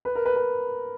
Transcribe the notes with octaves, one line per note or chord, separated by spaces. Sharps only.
B4
A#4
B4
B4